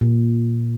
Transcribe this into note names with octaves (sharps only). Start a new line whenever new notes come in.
A#2